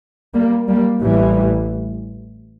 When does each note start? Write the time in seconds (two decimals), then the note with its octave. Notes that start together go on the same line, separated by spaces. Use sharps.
0.34 G3 A#3
0.68 G3 A#3
1.02 A1 A2 E3 G3